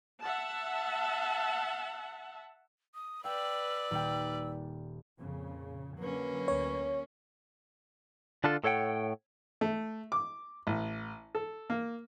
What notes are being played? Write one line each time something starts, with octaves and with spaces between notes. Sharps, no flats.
E5 F#5 A5
D#6
B4 D5 F5 G5 E6
D#1 G5
F2 A#2 C#3
D3 F#3 A#3 C#4 B4
D2 C#5
D3 D4 F4 A4
A2 A4 C#5 F#5 G5
A3
D6
A1
A4
A#3